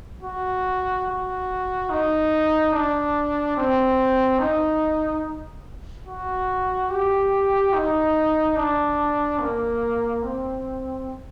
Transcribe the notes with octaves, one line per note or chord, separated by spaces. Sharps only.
F#4
F#4
D#4
D4
C4
D#4
F#4
G4
D#4
D4
A#3
C4